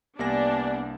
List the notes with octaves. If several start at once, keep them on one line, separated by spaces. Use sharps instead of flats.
C2 A#3 B3 D4 G4 D5 G#5 A#6